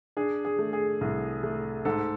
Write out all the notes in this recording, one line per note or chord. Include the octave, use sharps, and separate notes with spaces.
D4 G#4
G#4
A3
G#4
C2
A3
G#2 A4